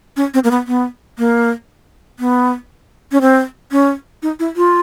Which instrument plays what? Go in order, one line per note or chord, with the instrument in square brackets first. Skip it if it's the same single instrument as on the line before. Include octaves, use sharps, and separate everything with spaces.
[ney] C#4
C4
A#3
B3
B3
A#3
B3
C#4
C4
C#4
D#4
E4
F4